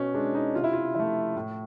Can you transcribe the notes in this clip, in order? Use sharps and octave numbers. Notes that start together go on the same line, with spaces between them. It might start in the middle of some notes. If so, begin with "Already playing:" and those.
Already playing: B2 C#4
G#3 D4
D#4
C3 F4
E4
F4
F3 A3 E4
A2